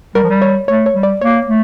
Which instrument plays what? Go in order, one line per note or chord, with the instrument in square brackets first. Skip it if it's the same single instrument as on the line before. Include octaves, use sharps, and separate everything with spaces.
[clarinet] G3 [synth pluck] A#4
[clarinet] F3
G3
[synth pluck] C#5
[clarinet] A3 [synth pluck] C#5
[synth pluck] C#5
[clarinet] G3
[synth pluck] D5
[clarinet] A#3 [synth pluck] C#5
[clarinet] A3